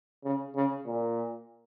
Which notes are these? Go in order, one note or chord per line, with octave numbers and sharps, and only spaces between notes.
C#3
C#3
A#2